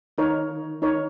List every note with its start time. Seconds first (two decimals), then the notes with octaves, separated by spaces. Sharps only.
0.18 D#3 D#4 A#4 C#5
0.82 D#4 A#4 C#5